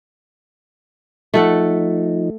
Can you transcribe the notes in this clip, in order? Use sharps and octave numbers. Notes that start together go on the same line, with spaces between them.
F3 A3 D#4 A4 F#5